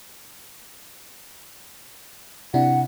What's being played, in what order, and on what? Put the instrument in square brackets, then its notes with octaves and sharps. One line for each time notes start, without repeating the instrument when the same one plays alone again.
[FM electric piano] C3 D4 E4 [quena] F#5